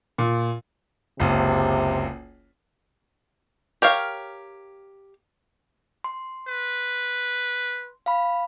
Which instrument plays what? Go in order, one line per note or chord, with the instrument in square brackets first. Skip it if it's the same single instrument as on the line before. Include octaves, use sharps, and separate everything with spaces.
[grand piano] A#2
[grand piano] F#1 C#2 [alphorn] C3
[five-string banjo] G4 A#4 C#5 F5
[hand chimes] C6
[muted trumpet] B4
[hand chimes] F5 B5